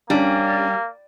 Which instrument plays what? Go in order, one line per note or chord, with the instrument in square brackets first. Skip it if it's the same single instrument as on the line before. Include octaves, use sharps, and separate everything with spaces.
[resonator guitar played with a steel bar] G3 [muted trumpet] A#3 [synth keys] C#4 D4